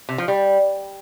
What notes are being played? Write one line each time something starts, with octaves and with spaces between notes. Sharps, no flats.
C3
F3
G3